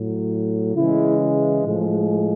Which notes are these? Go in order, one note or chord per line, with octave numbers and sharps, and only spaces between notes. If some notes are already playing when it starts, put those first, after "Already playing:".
Already playing: A2 F#3
C#3 E3 G#3 E4
A2 F3 G#3